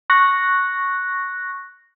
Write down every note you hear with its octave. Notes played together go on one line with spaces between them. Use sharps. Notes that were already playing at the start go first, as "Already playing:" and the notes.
C#6 F#6 A#6